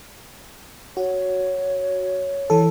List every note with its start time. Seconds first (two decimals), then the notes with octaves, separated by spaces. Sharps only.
0.97 F#4 C#5
2.50 E3 A4